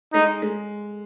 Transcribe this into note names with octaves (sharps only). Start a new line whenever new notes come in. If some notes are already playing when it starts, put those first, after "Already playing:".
G#3 D#4
G#3